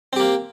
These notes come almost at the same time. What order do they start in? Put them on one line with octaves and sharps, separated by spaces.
C4 G4 A#3